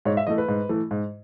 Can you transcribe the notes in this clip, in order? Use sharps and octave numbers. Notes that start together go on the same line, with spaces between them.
G#2 C#5
E5
E3 A3 D#5
B4
G#2
E3 A3
G#2